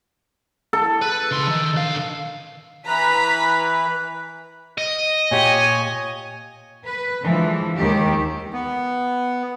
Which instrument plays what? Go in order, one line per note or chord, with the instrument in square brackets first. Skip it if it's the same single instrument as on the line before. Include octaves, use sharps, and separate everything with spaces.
[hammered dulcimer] A4
[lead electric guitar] B4
C#3 C6
D#3
D3 F5
[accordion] E3 B4 [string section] A#5 B5 B6
[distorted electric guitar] D#5
[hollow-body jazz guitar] A#2 G4 [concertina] C#5 G#5
[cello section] B4
D3 E3 F3 G#3
D#2 D#3 G#3 G4
[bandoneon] B3